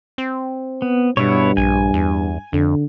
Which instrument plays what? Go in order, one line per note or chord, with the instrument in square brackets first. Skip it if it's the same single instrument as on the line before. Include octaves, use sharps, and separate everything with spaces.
[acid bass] C4
[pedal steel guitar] B3
[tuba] G2 [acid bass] B2 [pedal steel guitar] B3 E4 C#5
[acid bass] A#1 [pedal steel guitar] G#5
[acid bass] E2
[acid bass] F2 [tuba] D3